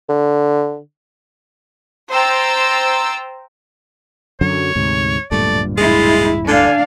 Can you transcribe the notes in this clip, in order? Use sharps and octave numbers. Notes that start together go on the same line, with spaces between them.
D3
C5 G5 A#5 E6 A6
F#2 D3 F#3 C#5
D2 G#2 C3
D1 G2 A#2 A3 D5
G#3 E4 F4
D3 D4 F5 G#5